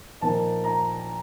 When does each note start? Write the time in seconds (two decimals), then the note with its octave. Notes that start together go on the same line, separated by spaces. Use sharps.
0.21 A#2 F3 A#3 D#4 A5
0.64 A#5